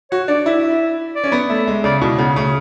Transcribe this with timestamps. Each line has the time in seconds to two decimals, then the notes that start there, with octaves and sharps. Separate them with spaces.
0.11 F#4 C#5
0.28 D4 D5
0.46 E4 E5
1.15 D5
1.24 C#4
1.32 B3
1.49 A3 E5
1.67 G#3
1.84 C#3 D5
2.01 B2 E4
2.18 C#3 B3
2.36 C#3 A3